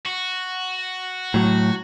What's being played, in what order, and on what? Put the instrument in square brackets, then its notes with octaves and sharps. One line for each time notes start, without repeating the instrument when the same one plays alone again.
[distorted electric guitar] F#4
[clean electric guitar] A2 F#3